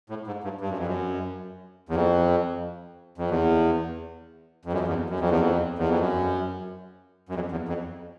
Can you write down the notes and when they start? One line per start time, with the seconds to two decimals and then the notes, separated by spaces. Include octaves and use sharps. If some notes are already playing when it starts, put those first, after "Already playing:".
0.09 A2
0.27 G#2
0.44 G2
0.61 G2
0.69 F#2
0.78 F2
0.87 F#2
1.89 E2
1.95 F2
3.18 F2
3.30 E2
4.65 F2
4.73 F#2
4.80 F2
4.88 E2
5.10 F#2
5.20 F2
5.30 E2
5.40 F2
5.79 E2
5.89 F2
6.00 F#2
7.29 F#2
7.35 F2
7.51 E2
7.69 F2